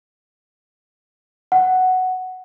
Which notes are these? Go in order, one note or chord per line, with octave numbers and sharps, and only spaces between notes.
F#5